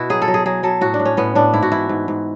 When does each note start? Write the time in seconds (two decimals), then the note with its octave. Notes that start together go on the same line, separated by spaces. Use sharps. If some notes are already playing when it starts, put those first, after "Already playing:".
Already playing: B2 E4 F#4
0.10 F#3 G#4
0.22 A4
0.28 F#3
0.34 G#4
0.46 F#3 G#4
0.63 F#3 A4
0.81 A2 F#4
0.94 D4
0.99 A2
1.05 C#4
1.17 A2 B3
1.35 A2 D4
1.53 G#2 E4
1.63 F#4
1.72 E3 E4
1.89 G#2
2.08 G#2